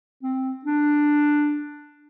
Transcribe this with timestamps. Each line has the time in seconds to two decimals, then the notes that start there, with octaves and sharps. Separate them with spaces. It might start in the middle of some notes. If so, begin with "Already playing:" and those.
0.23 C4
0.65 D4